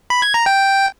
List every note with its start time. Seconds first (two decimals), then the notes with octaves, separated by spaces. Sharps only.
0.10 B5
0.22 G#6
0.34 A#5
0.46 G5